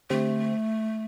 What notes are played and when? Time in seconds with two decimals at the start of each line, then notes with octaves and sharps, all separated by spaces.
0.10 D3 A3 C4 G4 C5